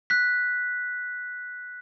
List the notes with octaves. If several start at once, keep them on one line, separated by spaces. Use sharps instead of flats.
F#6 B6